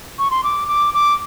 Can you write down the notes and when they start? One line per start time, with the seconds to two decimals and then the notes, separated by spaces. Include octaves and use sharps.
0.19 C#6
0.31 C6
0.44 D6
0.68 D6
0.94 D6